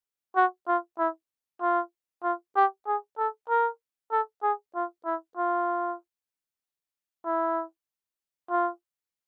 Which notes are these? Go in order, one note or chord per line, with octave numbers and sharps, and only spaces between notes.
F#4
F4
E4
F4
F4
G4
G#4
A4
A#4
A4
G#4
F4
E4
F4
E4
F4